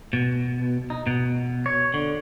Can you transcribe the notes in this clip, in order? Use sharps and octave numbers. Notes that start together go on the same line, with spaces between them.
B2
D#4
B2
C#5
D3